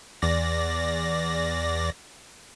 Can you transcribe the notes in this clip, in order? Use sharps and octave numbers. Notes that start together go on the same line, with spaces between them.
E2 D5 A#6